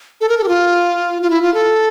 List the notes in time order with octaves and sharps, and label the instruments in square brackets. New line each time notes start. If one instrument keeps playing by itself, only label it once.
[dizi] A4
A#4
A4
G4
F4
F4
E4
F4
A4